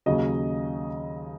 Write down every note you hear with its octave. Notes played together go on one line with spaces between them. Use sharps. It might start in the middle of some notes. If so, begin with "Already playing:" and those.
D#2 C#3 F#3 D#5